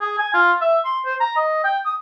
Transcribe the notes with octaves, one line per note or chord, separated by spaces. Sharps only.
G#4
G#5
F4
E5
C6
C5
A#5
D#5
G5
D#6